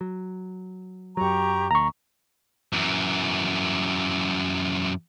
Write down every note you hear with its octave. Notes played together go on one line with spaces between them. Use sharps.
F#3
F#2 F#3 G4 A#5 C#6
D2 A#5 C#6
F#2 E3